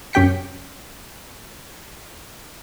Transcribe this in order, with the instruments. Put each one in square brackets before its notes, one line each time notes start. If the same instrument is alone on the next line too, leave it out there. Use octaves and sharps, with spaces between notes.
[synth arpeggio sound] F#2 C#4 G4 G5 B6 C#7